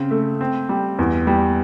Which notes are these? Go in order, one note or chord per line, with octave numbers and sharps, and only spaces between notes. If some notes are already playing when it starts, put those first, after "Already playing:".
Already playing: C#3 C4
A3
C4
G3
E2
G3